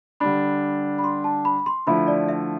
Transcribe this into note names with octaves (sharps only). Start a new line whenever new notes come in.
D3 G3 D4 B5
B5
C6
A5
B5
C6
D3 F3 A3 E4 B5
D5
E5